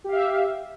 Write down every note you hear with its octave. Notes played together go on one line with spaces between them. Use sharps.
G4 E5 F5